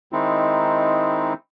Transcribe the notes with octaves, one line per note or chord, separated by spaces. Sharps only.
D#3 G#3 C4 D#4 E4